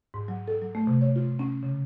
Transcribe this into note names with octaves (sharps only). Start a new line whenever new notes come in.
G#2
F#3
A4
F#3
A3
C3
C#5
F4
C#4
C#3